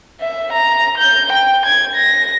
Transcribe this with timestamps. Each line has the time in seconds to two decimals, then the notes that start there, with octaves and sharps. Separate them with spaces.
0.21 E5
0.53 A#5
0.98 G6
1.33 G5
1.66 G#6
1.96 A#6